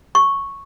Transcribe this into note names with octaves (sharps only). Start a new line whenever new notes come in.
C#6